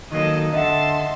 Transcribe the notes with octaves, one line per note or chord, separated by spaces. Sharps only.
D#3 F#3 A#3 A4 D#5
D3 D#5 E5 F#5 A5 C6